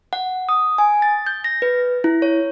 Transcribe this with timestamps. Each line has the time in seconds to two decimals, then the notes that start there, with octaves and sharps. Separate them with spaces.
0.13 F#5
0.49 D#6
0.78 G#5
1.02 A6
1.27 G6
1.44 A#6
1.62 B4
2.04 E4
2.22 C#5